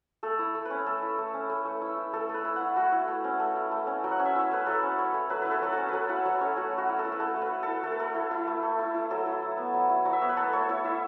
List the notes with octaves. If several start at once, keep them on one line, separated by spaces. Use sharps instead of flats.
A3 A4
E4
A3
C#4 B4
A3 A4
E4
A3
C#4
A3
A3
E4
E4
A3 A4
A3
B4
E4
E4 F#5
A3 F#4
E4
A3
C#4
A3
E4
A3
C#4
F#3
F#5
C#4
E5
E4 C#5
A3 B4
F#3 A4
C#4
E4 C#5
A3
F#3 B4
E4 B4
A4
F#3 A4
F#4
C#4
F#3 A4 B4
E4 F#5
F#3 C#5
C#4 A4
A3 F#4
A3
F#4
E4
A4
E4
B4
A3 A4
A3
B4
E4
E4 A4
A3 A4
B4
A3 A4
E4
E4
A3
A3
E4
E4
F#3 A4
E4
F#3
B3
F#3
E4
F#3
E5
B3 C#5
B4
A3 A4
A3 C#5
E4 C#5
E4 E5